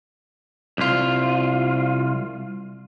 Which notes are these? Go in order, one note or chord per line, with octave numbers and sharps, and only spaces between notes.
C2 F4